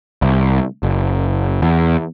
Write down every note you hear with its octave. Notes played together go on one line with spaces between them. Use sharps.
C2
F#1
E2